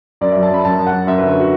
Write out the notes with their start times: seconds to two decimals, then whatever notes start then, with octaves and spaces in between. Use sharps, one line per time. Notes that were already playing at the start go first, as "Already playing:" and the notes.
0.21 F#2 D5
0.32 F#3 E5
0.43 A5
0.51 F#2 B5
0.65 F#2 A5
0.79 F#2
0.87 F#5
0.93 F#2
1.07 F#2 E5
1.18 D3 B4
1.29 F#4
1.40 F#4